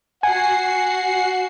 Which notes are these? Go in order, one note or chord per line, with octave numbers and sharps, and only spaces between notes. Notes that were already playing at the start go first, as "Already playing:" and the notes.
F#4 F#5 G#5 C7